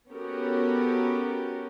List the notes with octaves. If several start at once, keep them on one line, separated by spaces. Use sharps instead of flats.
B3 C#4 F#4 G4 A4 A#4